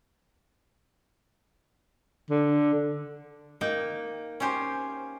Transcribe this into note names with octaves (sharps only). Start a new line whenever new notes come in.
D3
A#3 D#4 G5
C#4 F4 G4 C5